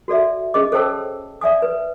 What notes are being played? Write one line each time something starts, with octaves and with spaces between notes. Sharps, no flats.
F#4 A4 D5 E5
C#4 G#4 D#5 D6
A4 C5 C#5 G5 A5 E6
D5 E5 G#5 D#6
B4